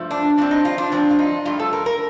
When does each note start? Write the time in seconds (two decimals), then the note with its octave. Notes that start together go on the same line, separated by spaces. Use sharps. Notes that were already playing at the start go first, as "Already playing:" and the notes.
Already playing: G2 F3 A3
0.11 D4
0.38 G2 F3 C4 D4
0.51 D#4
0.65 F4
0.78 D4
0.91 G2 F3 C4 D4
1.11 F4
1.19 D#4
1.45 G2 F3 A3 F4
1.60 A4
1.73 A#4
1.86 A#4